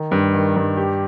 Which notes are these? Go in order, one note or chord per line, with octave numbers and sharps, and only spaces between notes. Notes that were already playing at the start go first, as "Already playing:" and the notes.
Already playing: D#3
G2
D#3
G2
G4